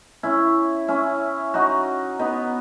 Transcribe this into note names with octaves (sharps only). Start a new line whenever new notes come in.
C#4 E4
C#4 E4
D#4 F#4
B3 D#4